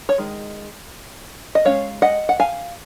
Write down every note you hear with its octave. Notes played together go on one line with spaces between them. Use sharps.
C#5
D#3 G#3
D#5
G#3 C#4 C#5 F5
D#5 F#5
F#5
F5 G#5